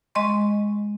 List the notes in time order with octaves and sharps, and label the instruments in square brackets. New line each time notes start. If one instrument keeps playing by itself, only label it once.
[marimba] G#3 D#5 C6 C#6